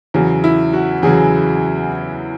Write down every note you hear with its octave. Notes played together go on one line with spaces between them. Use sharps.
E2 C#3 F#3
E4
F#4
E2 C#3 F#3 G#4